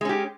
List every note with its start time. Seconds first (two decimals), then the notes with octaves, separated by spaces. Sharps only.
0.01 G#3
0.05 C#4
0.09 G4